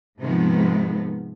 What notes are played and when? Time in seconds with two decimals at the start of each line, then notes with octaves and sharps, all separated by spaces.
0.21 G#2 C3 D#3 F3 G#3 B3